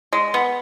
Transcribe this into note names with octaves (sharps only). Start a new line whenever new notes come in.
G#3
B3